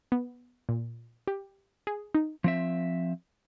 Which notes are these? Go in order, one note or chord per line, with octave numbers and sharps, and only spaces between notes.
B3
A#2
G4
G#4
D#4
F3 C4 E5